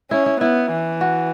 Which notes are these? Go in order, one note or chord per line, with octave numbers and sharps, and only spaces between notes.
C#4 E4
E4
B3 E4
E3
F#4